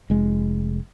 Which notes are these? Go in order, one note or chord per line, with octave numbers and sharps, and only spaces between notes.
F1 G#3